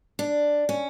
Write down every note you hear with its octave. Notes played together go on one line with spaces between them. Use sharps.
D4
C#4